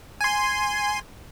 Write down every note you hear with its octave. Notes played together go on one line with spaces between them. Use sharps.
G#5 C6